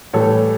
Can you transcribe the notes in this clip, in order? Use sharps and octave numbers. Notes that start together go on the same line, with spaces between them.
A2 E3 G3 A4 C#5